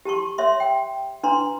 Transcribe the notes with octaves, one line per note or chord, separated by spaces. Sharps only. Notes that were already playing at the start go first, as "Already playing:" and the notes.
G4 A5 C6 C#6
C#5 E5 C6
G5
D4 B4 A#5 C6